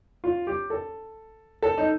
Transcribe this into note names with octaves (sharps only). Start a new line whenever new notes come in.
F4
G4
A4
A4
D#4